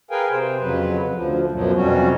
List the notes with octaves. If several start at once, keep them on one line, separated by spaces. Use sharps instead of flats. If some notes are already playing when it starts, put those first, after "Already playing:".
G#4 A#4 B4 F5 G5 G#5
C3 C5
F2 C#3 F#3 B4
D2 F3
F#2 B2 F3 F#3
F2 C3 F#3 G3 C#4 F#4